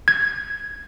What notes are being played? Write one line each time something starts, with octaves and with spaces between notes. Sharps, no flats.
G#6